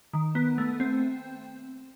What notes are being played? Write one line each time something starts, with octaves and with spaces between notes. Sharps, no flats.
D#3
B3
A3
C4